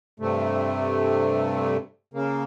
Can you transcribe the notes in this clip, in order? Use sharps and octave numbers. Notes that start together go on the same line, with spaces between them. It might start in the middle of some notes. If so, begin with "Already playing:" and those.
G2 C3 A3
C#3 A#3